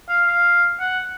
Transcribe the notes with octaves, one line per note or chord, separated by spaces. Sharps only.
F5
F5
F#5